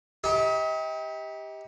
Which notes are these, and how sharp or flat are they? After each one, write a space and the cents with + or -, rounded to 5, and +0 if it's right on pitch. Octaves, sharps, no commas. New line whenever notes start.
D#4 +40 G4 +10